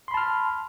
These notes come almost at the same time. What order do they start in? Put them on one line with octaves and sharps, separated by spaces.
C6 B5 A5 F6